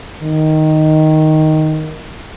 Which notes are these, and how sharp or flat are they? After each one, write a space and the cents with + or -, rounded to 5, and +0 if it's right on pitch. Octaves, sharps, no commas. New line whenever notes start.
D#3 +0